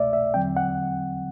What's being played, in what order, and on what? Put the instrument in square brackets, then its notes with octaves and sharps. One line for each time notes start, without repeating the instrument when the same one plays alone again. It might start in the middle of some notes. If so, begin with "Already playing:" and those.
Already playing: [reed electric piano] C2 B2 A3 D5 E5
E5
E2 D3 F#3 C4 G5
F#5